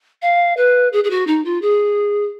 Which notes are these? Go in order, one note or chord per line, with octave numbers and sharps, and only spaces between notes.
F5
B4
G#4
G#4
F#4
D#4
F4
G#4